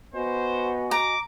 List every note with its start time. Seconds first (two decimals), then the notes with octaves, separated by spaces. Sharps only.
0.14 B3 F#4 C5 D#5 G#5
0.91 A#5 D6